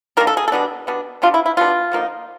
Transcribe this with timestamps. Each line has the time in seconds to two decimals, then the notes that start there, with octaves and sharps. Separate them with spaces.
0.17 D#3 G3 A#3 D4 A#4
0.27 A4
0.37 G#4
0.48 A4
0.52 B2 G3 B3 D4
0.87 B2 G3 B3 D4
1.22 B2 G3 B3 D4 F4
1.34 E4
1.46 E4
1.57 B2 G3 B3 D4 F4
1.92 D3 F3 A#3 D#4